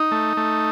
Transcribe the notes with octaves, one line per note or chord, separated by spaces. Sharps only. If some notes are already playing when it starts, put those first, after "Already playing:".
Already playing: D#4
A3
A3